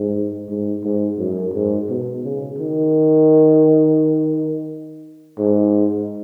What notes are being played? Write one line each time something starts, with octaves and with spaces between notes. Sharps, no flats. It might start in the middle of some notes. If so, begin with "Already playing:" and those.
Already playing: G#2
G#2
G#2
F#2
G#2
B2
C#3
D#3
G#2